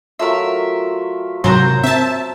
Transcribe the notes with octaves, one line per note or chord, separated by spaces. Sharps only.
F#3 A3 F4 A#4 E5
G#2 C3 F#3 A#4 C5 A#5
C4 E5 A5